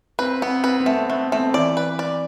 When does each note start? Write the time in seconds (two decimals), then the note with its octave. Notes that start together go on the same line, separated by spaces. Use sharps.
0.19 C4 B4
0.42 B3 C4
0.64 C4 B4
0.80 B3
0.86 A3 C4
1.09 A3 B3
1.32 A3 C4
1.54 E3 E4 D5
1.77 B4
1.99 D5